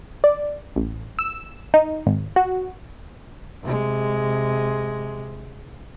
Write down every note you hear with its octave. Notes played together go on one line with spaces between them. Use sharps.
D5
A1
E6
D#4
G#1
F#4
C3 G#3